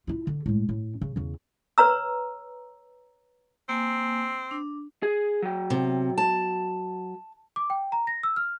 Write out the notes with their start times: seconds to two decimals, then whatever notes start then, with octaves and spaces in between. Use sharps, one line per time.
0.07 E4 F4
0.27 D3
0.46 A2 G#3
0.69 A2
1.01 C#3
1.16 E2 C#3
1.78 B4 C#5 A#5 E6
3.69 A#3 C4 G#5
4.51 D4
5.03 G#4
5.43 F#3 G5
5.70 C3
6.18 A5
7.56 D6
7.70 G5
7.92 A#5
8.07 A#6
8.23 E6
8.36 F6